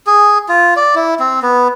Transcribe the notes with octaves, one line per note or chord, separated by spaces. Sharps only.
G#4
F4
D5
E4
C4
B3